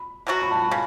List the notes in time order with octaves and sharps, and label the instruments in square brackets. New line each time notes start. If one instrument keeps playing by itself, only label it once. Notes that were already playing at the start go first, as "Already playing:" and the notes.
Already playing: [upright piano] B5
[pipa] B2 F#3 C#4 F#4
[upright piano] B5
A5
B5
[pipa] C#3